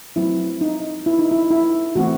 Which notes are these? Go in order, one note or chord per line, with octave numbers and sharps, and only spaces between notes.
F#3 A3 C4 E4
D#4
E4
D#4
E4
E4
E3 A3 C4 F#4